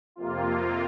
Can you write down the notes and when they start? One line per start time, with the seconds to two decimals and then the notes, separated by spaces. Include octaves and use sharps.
0.16 F2 C3 A#3 F4